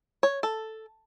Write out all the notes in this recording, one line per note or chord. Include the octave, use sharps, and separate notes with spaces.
C#5
A4